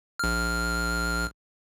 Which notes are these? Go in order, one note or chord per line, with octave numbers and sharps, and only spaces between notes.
A#1 F6